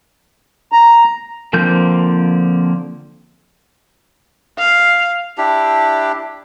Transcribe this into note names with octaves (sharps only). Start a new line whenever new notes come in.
A#5
D3 F3 A#3 C4 G6
F5
D4 E4 G4